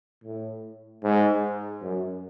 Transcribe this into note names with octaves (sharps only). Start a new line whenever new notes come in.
A2
G#2
F#2